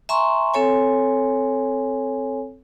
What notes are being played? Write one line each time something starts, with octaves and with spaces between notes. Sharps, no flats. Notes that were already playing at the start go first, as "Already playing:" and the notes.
E5 G#5 A#5 C6 C#6
C4 A4 C#5 G#5